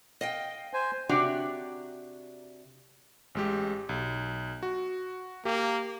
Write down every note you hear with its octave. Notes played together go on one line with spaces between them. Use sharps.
D#5 F5 G5
C5 G#5
C3 D4 F#4 G4 C#5 D5
A1 G#3 G4
B1
F#4
A#3 G4